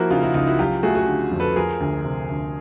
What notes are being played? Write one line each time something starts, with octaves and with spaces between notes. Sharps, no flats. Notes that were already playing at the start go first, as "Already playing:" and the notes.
Already playing: F3 A#3 E4 F#4 A#4 C5
C#3 D#4 F4
E4 F#4
C#2 D#4 F4
E4 F#4
F#3 F4 G4
A3 F#4 G#4
F#4 G#4
D3
F2
A4 B4
F3 G#4 A#4
D2
C3
D2